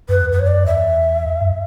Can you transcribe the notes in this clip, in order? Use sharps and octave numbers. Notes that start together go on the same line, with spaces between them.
F#2 B4
E2
F#2 B4
C#5
D5
E2 E5
F#2